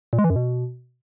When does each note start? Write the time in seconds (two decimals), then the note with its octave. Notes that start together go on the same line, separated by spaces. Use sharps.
0.13 A#2
0.19 G#3
0.24 E3
0.30 F#2
0.36 B2